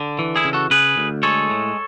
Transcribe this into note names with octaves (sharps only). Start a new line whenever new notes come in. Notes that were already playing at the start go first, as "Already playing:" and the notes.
Already playing: D3
E3
E4 G#4
C#3
F#4 A4
C#3 G#4 B4
D2
G#3 A4 C#5
A2